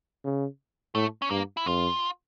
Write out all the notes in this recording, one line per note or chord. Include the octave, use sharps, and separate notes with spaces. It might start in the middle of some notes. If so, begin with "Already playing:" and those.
C#3
A2 A3
C#4
G2 A#3
E4
F2 F4